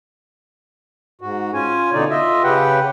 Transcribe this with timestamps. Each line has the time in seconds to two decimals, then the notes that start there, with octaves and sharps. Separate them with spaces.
1.21 G#2 F#4
1.54 C#4 F4 G#5
1.93 B2 D3 D#4 D5
2.10 F4 D#5 E5
2.44 C#3 G4 B4 F#5 G5